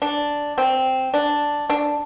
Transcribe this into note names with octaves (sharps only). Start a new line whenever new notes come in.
D4
C4
D4
D4